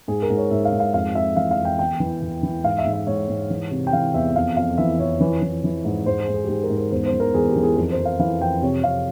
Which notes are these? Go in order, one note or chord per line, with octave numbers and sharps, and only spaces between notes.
G#2 G#4
A#4
G#2
C#5
G#2 E5
F5
G#2
F5
F2 F5
F2 E5
E3 F5
F5
F2
G5
E2 G5
E3
E2
E3
G#2 F5
E5
G#2
E5
G#2 C#5
G#2
E3
C3
G5
E3 F5
E2 E5
F2 F5
F2 F5
E3 E5
F2 C#5
E3
E3
E3
G#2
G#2 C5
G#4
G#2
G#4
G4
G#2 G#4
A#4
G#2
A#4
E2 C5
C5
E3
A#4
E2 G#4
G4
E3
G#4
F2 A#4
C5
F2
F5
E3 F5
F2 G5
C3 C#5
C3 F5